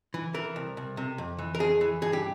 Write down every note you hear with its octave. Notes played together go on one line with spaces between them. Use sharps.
E3
E3 A#4
C2
C2
C3
F2
E3
A#4
F2 G#4
E3
G2 G#4
G4